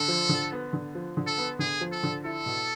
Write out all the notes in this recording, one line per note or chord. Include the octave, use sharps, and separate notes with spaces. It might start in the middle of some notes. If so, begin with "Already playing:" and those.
Already playing: D3 A4
F3
D3
B3
D3
F3
D3
A4
B3
D3 G#4
F3
A4
D3
E4 A4
B2